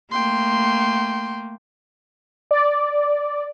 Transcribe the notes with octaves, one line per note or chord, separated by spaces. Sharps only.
A3 A#3 G5 C6
D5